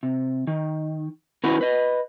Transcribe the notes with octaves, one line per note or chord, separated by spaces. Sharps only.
C3
D#3
D#3 C#4 E4 F#4 A#4 B4
B4 D#5